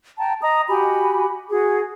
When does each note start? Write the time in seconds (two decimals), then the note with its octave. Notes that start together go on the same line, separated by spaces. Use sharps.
0.18 G5 A5 A#5
0.41 D#5 A#5 D#6
0.69 F#4 G4 G#5 B5
1.49 F#4 G#4